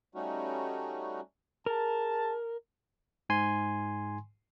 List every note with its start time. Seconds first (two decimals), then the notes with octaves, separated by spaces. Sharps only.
0.15 G3 A3 C#4 D#4 F#4
1.66 G#4 A#4 A5
3.29 G#2 G#5 C6